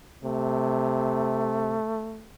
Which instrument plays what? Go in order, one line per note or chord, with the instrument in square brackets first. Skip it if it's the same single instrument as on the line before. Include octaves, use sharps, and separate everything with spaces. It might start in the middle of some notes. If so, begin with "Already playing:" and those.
[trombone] C3 [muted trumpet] A3